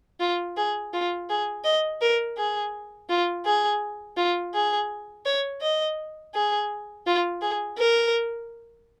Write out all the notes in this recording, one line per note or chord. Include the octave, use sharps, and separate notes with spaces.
F4
G#4
F4
G#4
D#5
A#4
G#4
F4
G#4
F4
G#4
C#5
D#5
G#4
F4
G#4
A#4